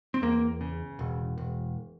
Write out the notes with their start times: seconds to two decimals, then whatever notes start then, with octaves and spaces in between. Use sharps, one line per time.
0.14 C4
0.22 E2 A#3
0.61 C#3
0.99 E1
1.38 E1